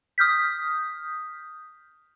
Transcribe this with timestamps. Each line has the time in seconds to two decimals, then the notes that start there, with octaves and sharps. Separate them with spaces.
0.18 D#6 F6 G6 B6